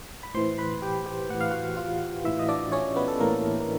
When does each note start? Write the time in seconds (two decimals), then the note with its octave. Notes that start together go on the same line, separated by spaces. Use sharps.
0.23 B5
0.34 A2 E3 C5 C6
0.58 B4 B5
0.82 G4 G5
1.06 G4 G5
1.30 A2 E3 F#5
1.41 F5
1.51 F#4 F#5
1.77 F4 F5
2.24 A2 E3 E4 E5
2.39 D#5
2.48 D4 D5
2.72 C#4 C#5
2.96 B3 B4
3.08 A4
3.20 A2 E3 A#3 A#4
3.60 A#4